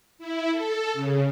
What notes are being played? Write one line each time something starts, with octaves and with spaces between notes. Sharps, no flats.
E4
A4
C#3